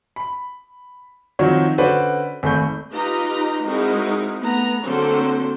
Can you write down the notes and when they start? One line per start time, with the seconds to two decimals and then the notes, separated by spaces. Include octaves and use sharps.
0.16 B5
1.39 D#3 F3 F#3 C4 F#4 C#5
1.78 D3 C#4 F#4 B4 C5 D5
2.43 G#1 A3 B5 C#6 G6
2.93 D#4 F4 G4 B4 D#5 A#5
3.63 G#3 C4 D#4 E4 F#4 A#4
4.40 A3 B3 A#5
4.83 D3 F#3 A#3 C4 A4 C5